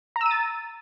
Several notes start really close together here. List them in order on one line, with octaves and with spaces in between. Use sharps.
A#5 E6 D#7 A6